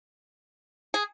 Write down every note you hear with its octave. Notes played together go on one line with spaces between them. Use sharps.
G#4